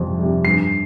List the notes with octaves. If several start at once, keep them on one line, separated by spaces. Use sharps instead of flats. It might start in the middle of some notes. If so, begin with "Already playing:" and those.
Already playing: F2 C3 G3
C3 G3
G2 C7